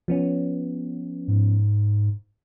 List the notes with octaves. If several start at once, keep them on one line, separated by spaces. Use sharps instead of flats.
F3 B3 C#4
G#2